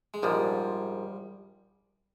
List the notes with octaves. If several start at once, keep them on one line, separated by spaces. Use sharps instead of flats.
G#3
A#1 G#2 F3 G3